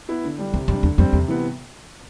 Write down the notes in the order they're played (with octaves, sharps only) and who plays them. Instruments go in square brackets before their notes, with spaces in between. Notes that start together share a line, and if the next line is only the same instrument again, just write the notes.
[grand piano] B3 E4
D3
G3 D4
[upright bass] E2 [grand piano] C3
[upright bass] F2 [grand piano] G3 D4
[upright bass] E2 [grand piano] D3
[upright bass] F2 [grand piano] G3 C4
[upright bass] E2 [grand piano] C3
[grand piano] E3 B3